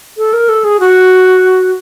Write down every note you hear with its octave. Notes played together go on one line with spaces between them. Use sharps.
A4
A#4
A4
G#4
F#4